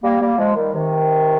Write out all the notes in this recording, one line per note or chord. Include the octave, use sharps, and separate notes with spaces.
G3 A#3
G3 A#3
F3 G#3
D#3 G3
C3 D#3